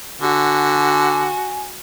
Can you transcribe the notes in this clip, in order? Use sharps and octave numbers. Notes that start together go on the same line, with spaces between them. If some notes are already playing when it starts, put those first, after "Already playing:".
D3 F#4 G#5